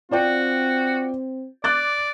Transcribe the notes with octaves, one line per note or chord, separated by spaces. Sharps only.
C4 F4 F#4 D5 G5
D5 D6 F#6 A6